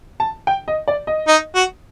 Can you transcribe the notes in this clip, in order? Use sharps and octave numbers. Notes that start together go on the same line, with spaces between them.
A5
G5
D#5
D5
D#5
D#4
F#4